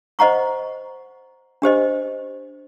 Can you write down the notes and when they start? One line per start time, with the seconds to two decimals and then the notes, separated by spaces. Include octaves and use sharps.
0.19 C5 D#5 F#5 A#5 C#6
1.62 D4 G4 C5 D#5